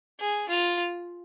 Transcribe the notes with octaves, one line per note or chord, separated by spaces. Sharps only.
G#4
F4